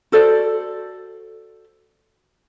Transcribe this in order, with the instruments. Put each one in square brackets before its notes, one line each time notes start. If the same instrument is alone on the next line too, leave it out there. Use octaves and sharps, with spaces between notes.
[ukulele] F#4 A4 C5 D5